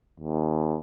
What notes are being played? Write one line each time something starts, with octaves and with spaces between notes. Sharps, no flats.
D#2